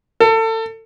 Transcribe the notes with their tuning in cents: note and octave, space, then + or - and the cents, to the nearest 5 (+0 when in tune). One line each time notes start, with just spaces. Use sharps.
A4 +30